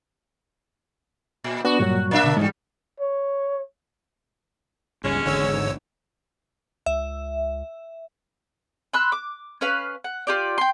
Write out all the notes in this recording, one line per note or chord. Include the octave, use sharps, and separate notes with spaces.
A#2
B3 D4 F#4
G2 A#2 F#3 G3
A#3 D4 E5
B2 D3
E2 G#2 F3 G3 G#3
C#5
G1 C#2 G2 G#3 C#4
G#1 E2 G#2 D3 C#5 E6
C#2 E5
B5 C6 E6 F#6
D6
C#4 B4 F5
F#5
F4 G4 D5
G5 C6